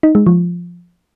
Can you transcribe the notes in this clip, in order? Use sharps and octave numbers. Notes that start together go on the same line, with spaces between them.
D#4
G#3
F3